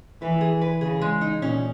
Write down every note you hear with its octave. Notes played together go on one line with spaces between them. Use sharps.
E3 B4
G#4
B4
C#3 G#4
G#3
D#4
A#2 C#4